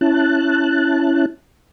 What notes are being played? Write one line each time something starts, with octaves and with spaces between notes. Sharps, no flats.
C#4 E4 A5 F#6